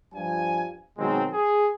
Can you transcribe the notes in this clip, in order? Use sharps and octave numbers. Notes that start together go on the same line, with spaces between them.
G2 F3 G3 G#5
B2 D#3 F#3 G#3 C4
G#4